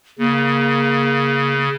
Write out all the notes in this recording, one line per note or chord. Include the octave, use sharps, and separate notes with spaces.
C#3 A#3